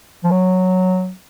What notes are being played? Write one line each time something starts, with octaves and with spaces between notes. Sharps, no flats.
F3
F#3